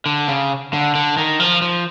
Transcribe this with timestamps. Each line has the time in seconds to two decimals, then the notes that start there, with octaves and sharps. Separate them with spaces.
0.06 D3
0.28 C#3
0.73 D3
0.95 D3
1.17 D#3
1.40 F3
1.62 F3